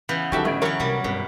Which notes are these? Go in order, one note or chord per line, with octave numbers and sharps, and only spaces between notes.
C#3 E3 B3 G6
D3 D#3 F#3 F#4 G4 A4 E5
A1 A3 G#6 D7
E3 F#3 A3 A#4 C#5 C#6
C3 F#3 G3
G#1 G2 B2